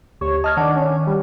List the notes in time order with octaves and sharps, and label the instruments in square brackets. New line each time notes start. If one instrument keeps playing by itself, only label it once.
[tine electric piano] D2 G4 [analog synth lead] C#5
[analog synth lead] D#5 [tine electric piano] A5 F6 G#6
[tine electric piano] D#3 F#5 [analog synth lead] D4
[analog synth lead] C#4
G3